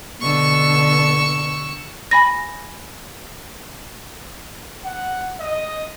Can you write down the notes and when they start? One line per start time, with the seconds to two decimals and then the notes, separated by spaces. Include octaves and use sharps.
0.21 B2 D3 C#6 E6
2.11 G#5 B5 A#6
4.85 F#5
5.40 D#5